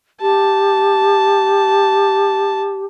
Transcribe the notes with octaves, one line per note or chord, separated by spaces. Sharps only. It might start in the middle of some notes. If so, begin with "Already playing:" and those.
G4 A5